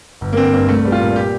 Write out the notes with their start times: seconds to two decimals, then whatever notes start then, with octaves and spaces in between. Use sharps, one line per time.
0.21 G1
0.33 A#3
0.37 D3 C4
0.53 G2 A#3
0.68 C2 A3
0.85 G3
0.92 F4
1.01 A#2
1.16 G4